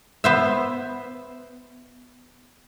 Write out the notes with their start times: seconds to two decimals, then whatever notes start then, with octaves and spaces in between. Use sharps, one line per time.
0.24 B3 C5 E5